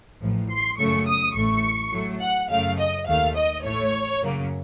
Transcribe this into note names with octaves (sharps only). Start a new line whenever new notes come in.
A1 A2 F3
C6
F#2 C#3 F#3 A3 C#6
D#6
A1 A2 A3 C#6
A2 F#3 A3
F#5
F#2 C#3 F#3 A3 F5
D#5
D#2 D#3 A3 F5
D#5
A1 A2 A3 C#5
F#2 C#3 F#3 A#3